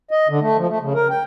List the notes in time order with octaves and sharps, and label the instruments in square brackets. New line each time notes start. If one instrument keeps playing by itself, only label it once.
[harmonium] D#5
D3
A3
F3
A3
C#3
A#4
G5